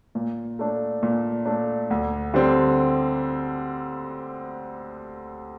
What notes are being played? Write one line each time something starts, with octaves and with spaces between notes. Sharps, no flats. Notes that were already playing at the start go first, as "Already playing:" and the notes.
A#2
A3 D4
A#2
A3 D4
D2
D3 G3 C4